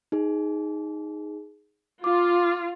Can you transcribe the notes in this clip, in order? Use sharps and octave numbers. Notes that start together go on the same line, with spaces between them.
D#4 G#4
F4 D6